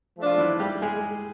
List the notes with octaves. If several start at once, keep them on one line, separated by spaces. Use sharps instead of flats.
F3 A3 D4
F4
E3 E4
G3 G4
G#3 G#4